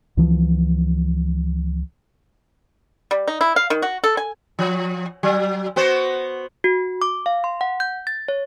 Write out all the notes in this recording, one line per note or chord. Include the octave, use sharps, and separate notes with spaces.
C#2 E3 F3
G3
D#4
E4
F5
D#3
F#4
A4
G#5
F3
F#3
B3 F#4 C5
F#4
D6
F5
C6
F#5
G6
A6
C#5